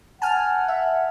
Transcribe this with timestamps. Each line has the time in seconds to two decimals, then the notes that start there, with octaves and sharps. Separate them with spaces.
0.22 F#5 G#5 A5 F6
0.68 E5